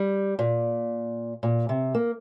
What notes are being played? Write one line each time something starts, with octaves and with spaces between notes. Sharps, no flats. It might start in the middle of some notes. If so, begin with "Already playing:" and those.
Already playing: G3
A#2
A#2
C3
A#3